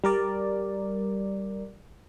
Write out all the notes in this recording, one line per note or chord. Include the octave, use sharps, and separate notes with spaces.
G3 A#4 D5